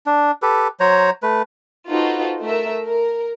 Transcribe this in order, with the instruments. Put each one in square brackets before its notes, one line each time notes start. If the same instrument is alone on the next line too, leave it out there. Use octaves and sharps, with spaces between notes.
[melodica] D4
G4 A4 B4
F#3 C5 C#5 A#5
A3 B4
[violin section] D#4 F4 F#4 A4 B4 C5
A3 A#4 E5
A#4